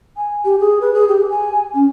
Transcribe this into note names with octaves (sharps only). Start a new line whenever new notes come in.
G#5
G4
G#4
B4
G#4
G4
G#5
C#4